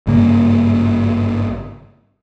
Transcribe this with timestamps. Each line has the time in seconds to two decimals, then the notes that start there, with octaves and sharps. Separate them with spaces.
0.07 G#1 G2 C#3 A#3